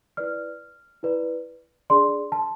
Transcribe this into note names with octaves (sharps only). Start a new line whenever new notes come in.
E4 B4 D5 F6
E4 B4 D5
D4 G#4 D5 C6
A5